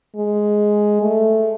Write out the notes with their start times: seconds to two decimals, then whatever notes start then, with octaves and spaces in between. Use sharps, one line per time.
0.16 G#3
1.02 A3